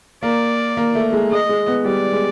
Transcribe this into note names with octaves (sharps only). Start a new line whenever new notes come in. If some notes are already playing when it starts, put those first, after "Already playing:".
A#3 D5
A#3
A3
G#3
G#3 D#5
G#3
B3
G3 D5
G#3